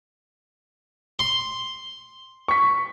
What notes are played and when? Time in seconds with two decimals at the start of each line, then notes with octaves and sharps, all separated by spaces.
1.19 C6
2.48 C#6 B6